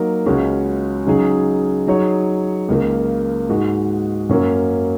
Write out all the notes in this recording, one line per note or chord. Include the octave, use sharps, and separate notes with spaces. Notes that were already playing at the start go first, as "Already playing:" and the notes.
Already playing: F#3 A#3 D#4 A#4
C#2 C#3 G#3 C#4 F#4
C#3 F#3 D#4 G#4
F#3 D#4 G#4 C#5
C#2 C#3 A#3
G#2 G#3 F#4
F#2 F#3 A#3 C#4